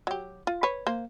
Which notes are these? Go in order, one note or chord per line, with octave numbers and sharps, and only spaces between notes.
F#3 G4
F4
B4 C#5
A#3 C5